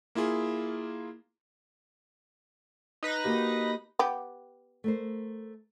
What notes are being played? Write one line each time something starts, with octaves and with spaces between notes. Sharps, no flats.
A#3 E4 F4 G#4
D#4 B4 A#6
A#3 F#4 G4
B3 G4
A3 A#4 C5